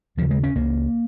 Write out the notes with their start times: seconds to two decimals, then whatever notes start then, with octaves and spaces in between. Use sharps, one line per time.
0.17 D#2 C#3 F3
0.30 G#3
0.43 C#4
0.55 C#2 C#3 A#3